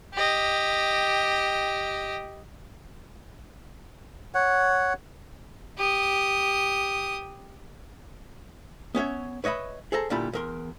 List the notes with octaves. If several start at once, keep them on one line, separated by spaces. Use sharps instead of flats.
G4 D#5
C#5 F#5
G4 D#6
B3 C#4 C#5 E5
B4 C#5 D#5 E5 B5
G#4 A4 C5 A5 A#5
A#2 D3 G3 E4 A5 B5
E2 A#4 C6